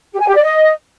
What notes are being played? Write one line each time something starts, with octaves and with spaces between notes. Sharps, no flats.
G4
G#5
G4
D5
D#5